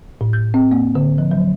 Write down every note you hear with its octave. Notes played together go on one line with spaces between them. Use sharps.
A2
G6
C4
A#3
D3
F3
F#3